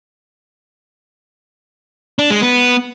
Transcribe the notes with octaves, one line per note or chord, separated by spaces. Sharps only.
D4
G#3
B3